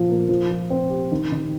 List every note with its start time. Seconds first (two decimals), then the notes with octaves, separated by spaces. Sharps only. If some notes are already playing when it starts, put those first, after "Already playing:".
Already playing: A#2 F3 F4
0.09 A#3
0.29 F3
0.50 F3
0.70 C4
0.90 G4
1.12 D#3
1.32 D#3